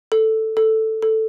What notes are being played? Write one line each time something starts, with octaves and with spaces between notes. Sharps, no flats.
A4
A4
A4